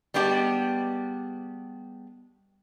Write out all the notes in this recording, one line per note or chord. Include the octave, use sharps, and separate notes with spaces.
G3 G#3 B3 D4 F#4 G4